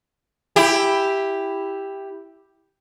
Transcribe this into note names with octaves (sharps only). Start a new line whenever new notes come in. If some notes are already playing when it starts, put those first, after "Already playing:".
E4 G4